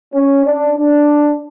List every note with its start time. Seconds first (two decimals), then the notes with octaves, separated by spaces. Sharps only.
0.15 C#4
0.46 D4
0.78 D4